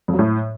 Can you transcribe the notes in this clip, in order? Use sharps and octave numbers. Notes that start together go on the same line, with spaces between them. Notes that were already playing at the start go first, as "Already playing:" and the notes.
F2
F#3
A2